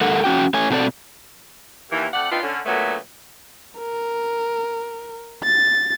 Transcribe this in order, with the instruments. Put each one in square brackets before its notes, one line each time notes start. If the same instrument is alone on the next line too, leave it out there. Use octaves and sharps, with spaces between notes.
[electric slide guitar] G2 A3 A4 A#4 F#5
F2 C#4 F#4 G5
A3 C#5 G#5
B2 C4 A4 C#5 D5
[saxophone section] D#2 E3
F2 A3 D5 F#5
C4 D4 D#4 F4 B4
D3 C#4
A#2 D3 F#3 A3 B3
[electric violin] A#4
A6